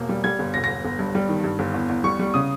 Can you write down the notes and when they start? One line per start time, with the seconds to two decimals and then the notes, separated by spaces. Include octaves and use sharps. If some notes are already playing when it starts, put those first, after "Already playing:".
Already playing: E1 A#3
0.09 G3
0.24 G3 G#6
0.39 G1
0.54 E1 A#6
0.64 A#6
0.70 E1
0.85 G1
0.99 G2
1.15 G3
1.29 D#3
1.44 G2
1.59 G1
1.74 E2
1.89 E2
2.04 G3 C#6
2.19 G3
2.34 C#3 D#6